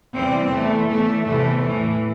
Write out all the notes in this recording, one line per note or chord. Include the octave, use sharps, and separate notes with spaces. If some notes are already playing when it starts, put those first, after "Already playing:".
E2 C3 E3 G3 C4
E2 E3 A3
E2 E3 A3
E2 C3 E3 A3
A2 E3